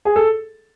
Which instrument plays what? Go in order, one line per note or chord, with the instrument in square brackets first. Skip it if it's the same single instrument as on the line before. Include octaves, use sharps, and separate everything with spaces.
[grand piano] G#4
A4